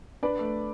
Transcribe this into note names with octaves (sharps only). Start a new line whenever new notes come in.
D4 B4 D5
A3